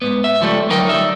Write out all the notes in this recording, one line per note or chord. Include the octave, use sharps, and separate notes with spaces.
G#2 B3
E5
C#2 F3 G3 A3
D2 F#3 D#4 A#4 G5
G3 D#4 E5